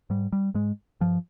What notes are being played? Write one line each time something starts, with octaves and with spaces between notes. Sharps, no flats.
G#2 G3
G3
G#2 G#3
G2 F3